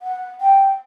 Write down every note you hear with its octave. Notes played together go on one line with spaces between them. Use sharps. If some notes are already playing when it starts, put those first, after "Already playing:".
F#5
G5